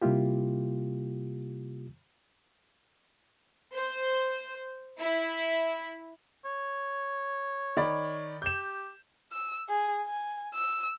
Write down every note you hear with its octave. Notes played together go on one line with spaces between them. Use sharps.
C3 G3 A#3 E4 F4 G4
C5
E4
C#5
D#3 D5 B5
G4 G6 E7
E6
G#4
G#5
E6